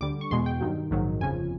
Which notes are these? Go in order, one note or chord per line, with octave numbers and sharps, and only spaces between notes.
D2 D3 G3 D6
C#6
E2 B2 G#3 C6
G5
G2 D#3 F#3
A#1 G#2 D#3 F#3
G1 F2 C#3 F3 G#5